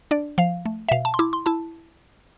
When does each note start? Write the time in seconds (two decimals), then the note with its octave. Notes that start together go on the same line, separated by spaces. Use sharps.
0.11 D4 D5
0.38 F3 F5
0.66 A3
0.89 E5
0.91 B2 F5
1.05 A5
1.14 C6
1.19 E4 D6
1.33 C6
1.46 E4 A5